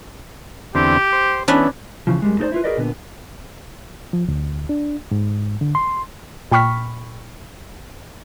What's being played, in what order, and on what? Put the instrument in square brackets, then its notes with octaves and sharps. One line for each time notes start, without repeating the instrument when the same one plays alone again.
[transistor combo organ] E2 D3 C4 [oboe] G4
[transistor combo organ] C5
[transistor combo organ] E3 B3 [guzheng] C#4 D4 B4
[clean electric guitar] E2 A#2 C#3 E3 F3
F#2 G3 G#3
A3 D#4 F#4 A4 C5 D5
E4 F4 B4
F#4 G#4 A#4 B4 D5 D#5
A#2 D3 B3
[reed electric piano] F3
D2
D4
G#2
D3
C6
[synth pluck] A#2 G5 B5 C#6 F6 B6